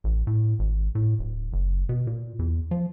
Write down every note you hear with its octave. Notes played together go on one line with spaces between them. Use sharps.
A1
A2
G#1
A2
D1
F#1
B2
A#2
E2
F3